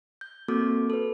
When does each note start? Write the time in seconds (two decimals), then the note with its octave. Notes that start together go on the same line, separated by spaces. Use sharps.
0.21 G6
0.48 A#3 C4 F#4 A4 D6
0.90 A4 B4